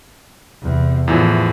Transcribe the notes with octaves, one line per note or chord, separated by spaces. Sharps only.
E2 C3
E2 A2 E3 F3